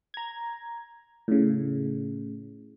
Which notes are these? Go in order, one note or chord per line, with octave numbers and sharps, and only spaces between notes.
A#5 G#6
A2 C#3